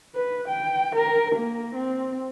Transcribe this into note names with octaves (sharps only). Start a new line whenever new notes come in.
B4
G5
A#4
A#3
C4